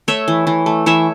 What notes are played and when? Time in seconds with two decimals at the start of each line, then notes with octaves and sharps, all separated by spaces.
0.08 A3 C#5 E5
0.28 E3
0.47 E3
0.66 A3
0.86 E3 C#5 E5